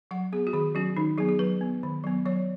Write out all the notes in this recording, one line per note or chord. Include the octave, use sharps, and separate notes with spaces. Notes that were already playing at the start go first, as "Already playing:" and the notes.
F#3 F#5
B3 G#4
F#4
D#3 G#4
F#3 C#4 F#4
D#3 D#4
F#3 B3 G#4
G#4
F#3 B4
B3
D#3
F#3 B3
F#3 C#5